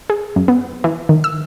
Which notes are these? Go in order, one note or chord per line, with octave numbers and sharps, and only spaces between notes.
G#4
F#2
B3
E3
D#3
E6